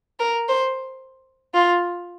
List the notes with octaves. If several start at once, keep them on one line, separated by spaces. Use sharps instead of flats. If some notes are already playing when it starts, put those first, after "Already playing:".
A#4
C5
F4